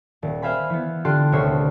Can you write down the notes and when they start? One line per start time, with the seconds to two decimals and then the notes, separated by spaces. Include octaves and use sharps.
0.22 D#1
0.42 C5 E5 F5 G#5 B5
0.70 E3 B3
1.05 D3 F4 G4 A4 C6 F#6
1.32 D#1 D2 C3 C#5 E6 C7